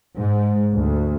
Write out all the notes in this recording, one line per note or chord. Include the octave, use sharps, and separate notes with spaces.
G#2
D2